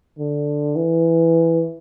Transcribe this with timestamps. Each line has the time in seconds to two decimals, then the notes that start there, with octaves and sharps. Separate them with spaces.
0.19 D3
0.76 E3